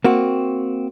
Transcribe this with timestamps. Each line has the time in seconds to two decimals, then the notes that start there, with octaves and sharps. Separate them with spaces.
0.04 A#3 C4 F#4